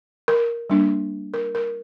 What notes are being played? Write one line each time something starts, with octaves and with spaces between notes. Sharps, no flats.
A#4
G3 A#3 D4
A#4
A#4